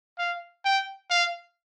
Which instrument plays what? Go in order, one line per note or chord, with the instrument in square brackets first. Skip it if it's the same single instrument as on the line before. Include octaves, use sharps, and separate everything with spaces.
[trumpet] F5
G5
F5